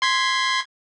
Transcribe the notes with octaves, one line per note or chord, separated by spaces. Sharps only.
C6 G#6 B6